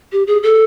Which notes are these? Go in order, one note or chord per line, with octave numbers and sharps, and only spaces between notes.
G4
G#4
A4